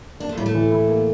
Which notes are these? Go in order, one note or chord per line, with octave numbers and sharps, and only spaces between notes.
A#3 D4
A3
A2 G3
A3
E3
E4
A#3